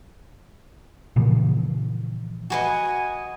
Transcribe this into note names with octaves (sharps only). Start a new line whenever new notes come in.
A#2 C#3 E3 F3
F#4 B4 D#5 G#5